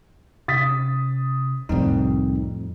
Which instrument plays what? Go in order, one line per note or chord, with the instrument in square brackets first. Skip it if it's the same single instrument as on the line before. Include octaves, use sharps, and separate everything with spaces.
[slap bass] C3 C#4 [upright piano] D#6 A6 B6
[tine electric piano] C2 C4 D#4 [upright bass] F2 A2 [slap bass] G3